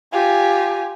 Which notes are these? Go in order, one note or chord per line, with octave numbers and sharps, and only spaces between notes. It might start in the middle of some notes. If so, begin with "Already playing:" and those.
F4 G4 G#5